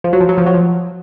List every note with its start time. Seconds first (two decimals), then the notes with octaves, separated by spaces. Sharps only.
0.04 F3
0.13 F#3
0.20 F3
0.29 F#3
0.38 F3
0.46 F#3
0.54 F3